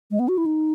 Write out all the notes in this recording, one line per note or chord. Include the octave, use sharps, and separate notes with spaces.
G#3
B3
F#4
E4
D#4